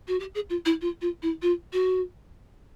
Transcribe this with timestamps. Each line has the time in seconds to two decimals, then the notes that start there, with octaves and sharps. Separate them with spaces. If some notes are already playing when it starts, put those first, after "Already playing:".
0.08 F#4
0.20 G4
0.35 G#4
0.50 F4
0.65 E4
0.81 F4
1.01 F4
1.22 E4
1.42 F4
1.73 F#4